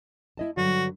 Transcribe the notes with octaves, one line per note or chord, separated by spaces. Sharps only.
E4 D#5 A5
G2 D3 F#3 F#4